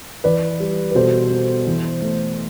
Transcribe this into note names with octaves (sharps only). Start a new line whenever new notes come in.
E3 B4 D5
G3
B4
B2 A4 C5
B3
E3
A3